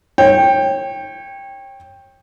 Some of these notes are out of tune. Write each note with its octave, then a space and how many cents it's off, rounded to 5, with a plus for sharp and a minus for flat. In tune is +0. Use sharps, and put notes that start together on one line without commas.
C#5 -25 G5 +10